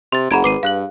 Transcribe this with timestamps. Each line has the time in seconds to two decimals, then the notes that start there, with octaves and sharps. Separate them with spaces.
0.12 C3 C6 A6
0.31 F#1 G#4 F#5 A#5 B5 G#6 D7
0.44 G#1 B4 D6 C7 D#7
0.63 G2 F5 F#6 F#7